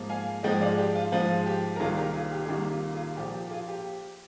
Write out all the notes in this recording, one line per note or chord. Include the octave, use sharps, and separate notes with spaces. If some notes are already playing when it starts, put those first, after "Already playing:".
Already playing: G#2 F3 A#3
F5 G#5
G#2 F3 G#3 D#5 G5
D5 F5
G4
F4
G#2 F3 G#3 F4
G4
A#4
C2 C3 D#3 A#3 F4 G#4
G4 A#4
F4 G#4
G4
G#4
C2 C3 D#3 A#3 G4
F4
F4 G#4
A#2 F3 A#3 G4
G4
F4 G#4
G4